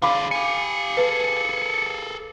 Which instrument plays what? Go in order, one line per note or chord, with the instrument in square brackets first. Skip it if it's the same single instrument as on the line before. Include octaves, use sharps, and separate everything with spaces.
[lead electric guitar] D3 G#4 [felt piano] F5 B5 D6
[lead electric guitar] G4 G#5 [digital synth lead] C#7
[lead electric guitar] G#4 A4 [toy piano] B4 G#5